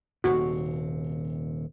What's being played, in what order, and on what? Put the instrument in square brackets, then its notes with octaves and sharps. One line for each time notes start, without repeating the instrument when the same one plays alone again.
[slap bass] D#1 D#2 C3 [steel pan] F#4